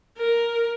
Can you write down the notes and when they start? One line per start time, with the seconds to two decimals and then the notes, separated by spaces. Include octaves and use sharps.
0.18 A#4